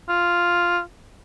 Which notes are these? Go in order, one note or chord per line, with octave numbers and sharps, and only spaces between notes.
F4